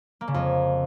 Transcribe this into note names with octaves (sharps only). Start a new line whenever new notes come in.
A#3
C#3
F2